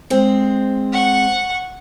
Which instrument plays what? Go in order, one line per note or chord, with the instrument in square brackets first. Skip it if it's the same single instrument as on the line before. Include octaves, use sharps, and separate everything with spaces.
[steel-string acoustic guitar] G#3 C4
[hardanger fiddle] F#5 C#6